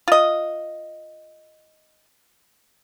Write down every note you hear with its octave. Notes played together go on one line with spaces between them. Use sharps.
F4 D#5